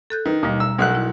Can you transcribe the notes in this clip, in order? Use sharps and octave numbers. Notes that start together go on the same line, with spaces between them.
A4 F#6 G6
D#3 B4
D#2 B2 G3
A#5 E6
B1 B2 A#4 F#5 F#6
E4